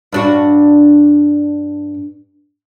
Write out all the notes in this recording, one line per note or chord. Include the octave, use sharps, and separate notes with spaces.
G2 D4 F#4